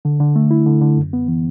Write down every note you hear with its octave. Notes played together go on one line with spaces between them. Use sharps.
D3
D3
A3
E4
D3
D3
F#2
B3
E3